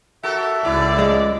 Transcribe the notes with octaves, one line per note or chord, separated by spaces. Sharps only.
F#4 A4 A#4 E5
C#2 D3 E4 D5
G#3